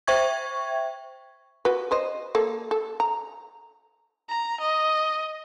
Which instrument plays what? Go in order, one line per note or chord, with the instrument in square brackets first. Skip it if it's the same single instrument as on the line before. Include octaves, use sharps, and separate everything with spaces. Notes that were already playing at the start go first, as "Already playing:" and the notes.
[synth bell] C5 E5 G5 C#6 G#6
[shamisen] F#4 B4
B4 C5 D#5
A#3 A4
A4
A#5
[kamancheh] A#5
D#5